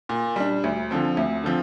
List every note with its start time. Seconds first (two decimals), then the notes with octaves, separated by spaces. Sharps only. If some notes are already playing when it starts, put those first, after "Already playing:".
0.09 A#2
0.36 G3 D4
0.64 D2
0.91 D3 F3 C4
1.17 D2
1.44 D3 F3 C4